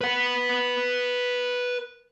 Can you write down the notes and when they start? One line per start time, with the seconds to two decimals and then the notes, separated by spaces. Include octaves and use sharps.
0.01 B4 F#5